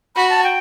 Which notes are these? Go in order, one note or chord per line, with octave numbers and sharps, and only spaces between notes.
F#4 B5
A5
G5